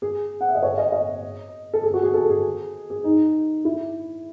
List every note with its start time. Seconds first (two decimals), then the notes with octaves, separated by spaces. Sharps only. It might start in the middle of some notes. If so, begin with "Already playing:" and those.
0.02 G#4
0.41 F#5
0.49 E5
0.55 D#5
0.63 C#5
0.78 D#5
0.92 D#5
1.73 A4
1.83 G#4
1.94 F#4
2.03 G#4
2.14 A4
2.30 G#4
2.90 G#4
3.04 D#4
3.65 E4